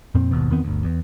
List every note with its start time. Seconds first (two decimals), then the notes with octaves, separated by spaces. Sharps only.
0.15 F2 A#2 C4
0.31 G#1 D#2 B2
0.51 E2 D#3 B3 C4
0.64 G1 D2
0.84 E2